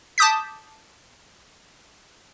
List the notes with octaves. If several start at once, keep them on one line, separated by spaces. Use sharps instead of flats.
A5 D6 D#6 G6 B6